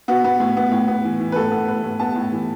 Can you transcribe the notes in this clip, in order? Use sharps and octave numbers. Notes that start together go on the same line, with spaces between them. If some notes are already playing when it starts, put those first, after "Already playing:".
B3 F#4
B3
A2
B3
A2
B3
E3
E3
B4
A2 A4
B3
A2 B4
A2
B3 A5
A2
E3